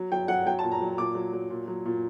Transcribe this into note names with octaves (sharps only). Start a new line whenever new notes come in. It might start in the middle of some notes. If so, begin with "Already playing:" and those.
Already playing: F#3
F#3 G5
F#3 F#5
F#3 G5
A5
A#2
A#5
F#3
A#2 D6
F#3
F#3
A#2
F#3
A#2